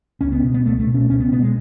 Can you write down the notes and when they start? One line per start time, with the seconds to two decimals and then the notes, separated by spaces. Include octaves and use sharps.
0.21 C#2 C#4
0.32 B3
0.43 B2
0.54 B3
0.65 C#2 A3
0.80 A3
0.87 B2
0.94 C#4
1.09 C#2 C#4
1.20 B3
1.31 B2 B3
1.43 G#3